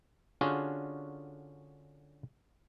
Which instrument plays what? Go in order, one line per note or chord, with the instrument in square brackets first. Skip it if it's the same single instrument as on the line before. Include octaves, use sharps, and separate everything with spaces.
[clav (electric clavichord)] D3 C#4 D4 F4 F#4 G#4